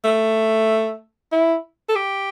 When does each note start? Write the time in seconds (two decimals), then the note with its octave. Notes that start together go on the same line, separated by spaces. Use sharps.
0.04 A3
1.32 E4
1.89 A4
1.96 G4